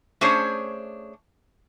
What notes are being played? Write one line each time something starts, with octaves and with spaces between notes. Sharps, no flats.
A3 C#4 D4 G#4 C5 C#5